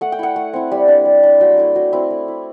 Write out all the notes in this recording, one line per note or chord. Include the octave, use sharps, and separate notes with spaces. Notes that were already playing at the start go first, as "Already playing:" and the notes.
A3 F#5
G5
E4 F#5
A3
C4 E4
G3
D4
G3
D4
F#3 G5
A3 E4
F#3
C4 E4
A3
E4